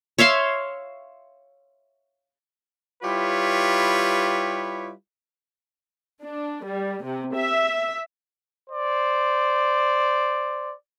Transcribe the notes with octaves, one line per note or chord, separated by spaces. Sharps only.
C#5 E5 F5 C6
G3 E4 F4 G4 B4 C#5
D4
G3
C3
E5
C5 D5